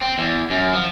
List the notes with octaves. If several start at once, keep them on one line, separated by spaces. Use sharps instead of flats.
C4
E2
F#2
F3